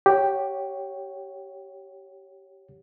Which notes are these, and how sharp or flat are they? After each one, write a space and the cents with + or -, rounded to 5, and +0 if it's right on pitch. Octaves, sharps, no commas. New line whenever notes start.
G4 +0 C#5 +0 F#5 -20